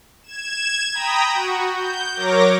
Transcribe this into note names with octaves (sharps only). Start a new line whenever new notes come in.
G#6 E7
G5 A#5 B5 D#6
F#4
G6
F#3 A#4 C#5 D6 A#6